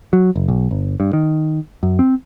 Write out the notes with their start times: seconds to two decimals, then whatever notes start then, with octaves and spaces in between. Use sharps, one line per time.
0.13 F#3
0.36 F#1
0.48 B1
0.71 G1
1.00 G2
1.13 D#3
1.83 F#2
1.99 C4